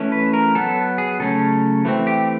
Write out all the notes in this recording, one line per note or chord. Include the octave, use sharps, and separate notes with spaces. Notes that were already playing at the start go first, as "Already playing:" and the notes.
Already playing: E3 A3 C#4
B4
A#4
F#3 B3 A4
G#4
C#3 F#3 A3 C#4 A4
E3 A3 C4
G4